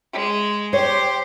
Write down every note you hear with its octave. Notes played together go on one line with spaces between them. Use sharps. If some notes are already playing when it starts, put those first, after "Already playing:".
G#3
G4 C5 C#5